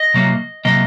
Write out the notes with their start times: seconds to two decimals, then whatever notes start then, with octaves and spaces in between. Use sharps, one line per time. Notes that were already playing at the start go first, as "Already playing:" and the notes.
Already playing: D#5
0.14 C3 F#3 A#3
0.65 C3 F#3 A#3 D#5